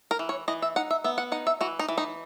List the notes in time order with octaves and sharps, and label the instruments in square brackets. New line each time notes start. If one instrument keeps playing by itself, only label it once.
[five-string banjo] A#4
E3
C#5
E3 D#5
E5
D#4 F#5
E5
B3 E5
F#5
D#4 F#5
E5
E3 F#4
D#4
E3
D#4